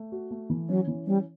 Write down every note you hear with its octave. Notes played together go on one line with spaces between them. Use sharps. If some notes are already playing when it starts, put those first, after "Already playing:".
Already playing: A3
F#4
A3
E3
F#3 C#4
E3
G3 C#4